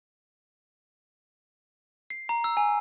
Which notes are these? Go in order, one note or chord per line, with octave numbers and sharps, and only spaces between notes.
C7
A#5
E6
G#5